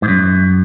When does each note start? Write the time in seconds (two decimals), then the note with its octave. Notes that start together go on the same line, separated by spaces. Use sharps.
0.02 G#2
0.08 F#2